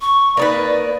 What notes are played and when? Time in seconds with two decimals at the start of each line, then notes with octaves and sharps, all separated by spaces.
0.01 C#6
0.37 A#3 D#4 B4 D5